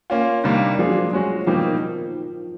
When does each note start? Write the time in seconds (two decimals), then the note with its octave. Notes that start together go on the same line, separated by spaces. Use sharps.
0.10 A#3 C#4 F4
0.44 C3 D#3 G3 A#3 D4
0.79 F3 A#3 D4 F4 G#4
0.87 F#3
0.97 F3
1.13 F#3 G#3 C#4 F#4
1.47 B2 F3 G3 A#3 D#4 G4
1.56 D#3